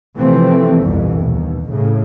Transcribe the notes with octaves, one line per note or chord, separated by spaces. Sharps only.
C3 E3 F3 A3 C4
G1 C2 F2 B2 E3
D#2 B2
A2 C#3